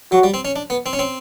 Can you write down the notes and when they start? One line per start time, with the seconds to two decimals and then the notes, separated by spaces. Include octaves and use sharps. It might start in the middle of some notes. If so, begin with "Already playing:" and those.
0.12 F#3 F#4
0.24 G3
0.34 C4
0.45 C#4
0.56 D4
0.70 B3
0.86 C4
0.93 C#4
0.99 C4